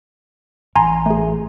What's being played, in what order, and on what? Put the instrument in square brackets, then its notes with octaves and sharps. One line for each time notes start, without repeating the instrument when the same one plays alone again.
[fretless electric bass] A1 [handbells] G#5 A#5 C6
[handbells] A3 G#4